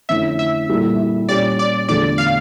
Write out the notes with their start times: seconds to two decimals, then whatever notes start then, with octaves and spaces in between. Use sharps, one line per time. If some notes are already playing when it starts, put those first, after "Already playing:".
0.09 F2 D3 A3 C#4 E4 E5
0.39 E5
0.69 A#2 G3 A#3 E4 A4
1.29 A#2 G3 C#4 G4 D5
1.59 D5
1.89 E2 D3 F3 A3 D5
2.18 F5